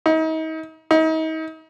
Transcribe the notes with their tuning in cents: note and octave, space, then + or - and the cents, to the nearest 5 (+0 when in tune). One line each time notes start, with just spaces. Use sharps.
D#4 +40
D#4 +40